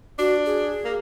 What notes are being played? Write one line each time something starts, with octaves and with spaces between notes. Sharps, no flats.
D4 F#4
G#4
A#3